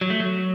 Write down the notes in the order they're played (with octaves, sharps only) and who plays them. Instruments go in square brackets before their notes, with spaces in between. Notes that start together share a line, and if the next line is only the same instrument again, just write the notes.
[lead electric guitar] F#3
A3
F#3